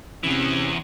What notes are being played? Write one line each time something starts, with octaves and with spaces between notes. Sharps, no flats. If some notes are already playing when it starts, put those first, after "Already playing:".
E2 C3 E3 C#4